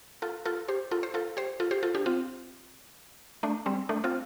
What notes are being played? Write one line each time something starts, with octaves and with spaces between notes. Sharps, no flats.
F4 A4
F4 A4
G4 C5
F4 A4
C5
F4 A4
G4 C5
F4 A4
G4 C5
F4 A4
D4 G4
C4 F4
A3 D4
G3 C4
A3 D4
C4 F4